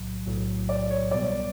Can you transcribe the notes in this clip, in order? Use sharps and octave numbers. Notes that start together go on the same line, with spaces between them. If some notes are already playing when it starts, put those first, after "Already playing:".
Already playing: B1 A2 F#3
B1 A2 F#3
D5
C#5
C2 B2 G3 B3 D5